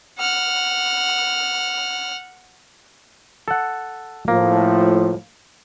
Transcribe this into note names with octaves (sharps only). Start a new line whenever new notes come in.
F#5 F6
A4 F#5
A2 F3 A#3